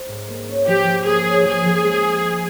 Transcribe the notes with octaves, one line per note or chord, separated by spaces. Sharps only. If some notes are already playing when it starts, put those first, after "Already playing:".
Already playing: C4
G#2
A#3
C#4
F3 G4
F3
A#3 G#4
C#4
F3 G#4
F3
G#3